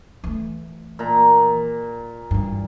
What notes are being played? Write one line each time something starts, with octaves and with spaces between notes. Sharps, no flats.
E3 A3
A#2 A#5
G2 E3